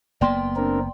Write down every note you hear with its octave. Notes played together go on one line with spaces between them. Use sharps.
F#1 A#3 B3 D5 G5 C6
C4 D4 A#4